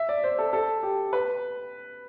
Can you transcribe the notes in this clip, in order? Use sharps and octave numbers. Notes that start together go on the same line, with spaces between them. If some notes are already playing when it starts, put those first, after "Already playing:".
Already playing: E5
D5
C5
A4
A4
G4
B4